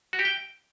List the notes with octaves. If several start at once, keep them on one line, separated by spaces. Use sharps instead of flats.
F#4
G4
G5